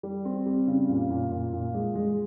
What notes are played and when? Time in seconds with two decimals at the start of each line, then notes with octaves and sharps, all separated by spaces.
0.03 G3
0.25 C4
0.46 G3
0.67 C#3
0.89 A#2
1.10 A#2
1.32 A#2
1.53 A#2
1.74 G#3
1.95 G#3